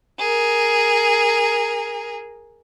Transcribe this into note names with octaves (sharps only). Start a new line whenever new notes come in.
G#4 A#4